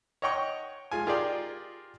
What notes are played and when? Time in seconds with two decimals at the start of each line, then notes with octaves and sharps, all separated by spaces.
0.22 C#5 D#5 F#5 G5 C#6
0.91 G#3 F4 G#5
1.07 F4 G4 G#4 A#4 D5 G5